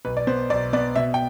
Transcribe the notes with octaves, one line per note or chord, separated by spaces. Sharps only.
B1 B4
D5
B3 C5
B1 D5
B3 D5
B2 E5
G5